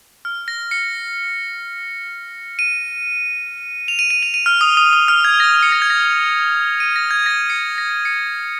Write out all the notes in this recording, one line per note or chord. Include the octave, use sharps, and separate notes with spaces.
F6
A#6
C#7
D#7
F7
D#7
D#7
F7
D#7
F6
D#6
D#6
D#6
F6
G#6
A#6
C#7
A#6
G#6
A#6
D#7
A#6
G#6
A#6
C#7
A#6
C#7
C#7